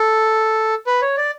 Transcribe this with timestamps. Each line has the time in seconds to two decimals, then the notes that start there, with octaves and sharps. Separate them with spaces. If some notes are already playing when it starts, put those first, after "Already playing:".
Already playing: A4
0.87 B4
1.02 C#5
1.17 D5